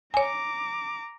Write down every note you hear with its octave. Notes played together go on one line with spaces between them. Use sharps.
C#5 G#5 A#5 D6